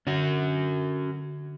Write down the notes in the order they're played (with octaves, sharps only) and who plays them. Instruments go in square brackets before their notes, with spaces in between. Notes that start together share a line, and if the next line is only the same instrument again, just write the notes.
[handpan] D3 [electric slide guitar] C#4 F#4